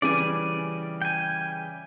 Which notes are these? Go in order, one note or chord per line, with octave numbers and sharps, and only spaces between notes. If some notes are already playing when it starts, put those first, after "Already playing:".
C#3 E3 G3 D5 G#5
G5 G#5